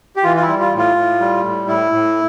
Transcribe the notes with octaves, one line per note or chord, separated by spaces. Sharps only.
G4
E3 F4
F4
E4
G3
F4
A2
F4
A2
G3
A2
A2 E4
A2